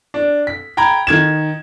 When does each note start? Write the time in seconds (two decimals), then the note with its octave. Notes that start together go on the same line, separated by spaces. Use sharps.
0.14 D4
0.47 B6
0.77 G5 A#5 B5 G#6
1.07 D#3 G#6 E7